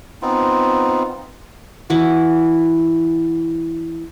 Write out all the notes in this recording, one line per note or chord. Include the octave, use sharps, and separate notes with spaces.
B3 C4 D#4 F4
E3 E4 F#4